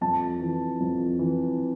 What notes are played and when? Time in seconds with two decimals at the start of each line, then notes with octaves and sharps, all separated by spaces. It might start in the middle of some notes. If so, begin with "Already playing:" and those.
0.01 F2 A5
0.41 E3
0.80 F2
1.19 E3